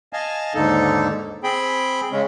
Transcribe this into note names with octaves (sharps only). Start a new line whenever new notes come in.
D#5 F5 G#5 A5
D#2 G#2 D3 D#4 A4
C4 G#4 G5 B5
C#3 G#3 C#4